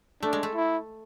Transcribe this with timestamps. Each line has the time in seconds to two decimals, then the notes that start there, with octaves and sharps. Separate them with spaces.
0.23 A3 D4
0.33 G#3
0.43 A3
0.55 E4